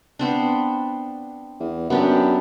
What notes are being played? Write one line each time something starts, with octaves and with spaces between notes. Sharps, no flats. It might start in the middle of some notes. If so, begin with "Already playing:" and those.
B3 C4 D4
E2
F#2 B3 D4 G4